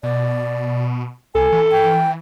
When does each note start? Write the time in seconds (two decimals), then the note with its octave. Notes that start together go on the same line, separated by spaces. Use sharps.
0.03 B2 D5
1.35 C2 A4 G#5
1.53 E3
1.71 G5